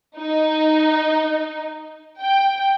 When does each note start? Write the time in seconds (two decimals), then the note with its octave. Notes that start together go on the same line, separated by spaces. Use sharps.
0.18 D#4
2.22 G5